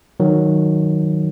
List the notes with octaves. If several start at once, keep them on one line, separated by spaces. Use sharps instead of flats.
D#3 F#3